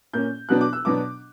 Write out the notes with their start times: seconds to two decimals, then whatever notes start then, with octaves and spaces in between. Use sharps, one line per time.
0.13 A#2 A#3 C#4 G6
0.49 B2 F#3 B3 D4 F#6
0.61 D6
0.73 E6
0.85 B2 F#3 B3 D4 D6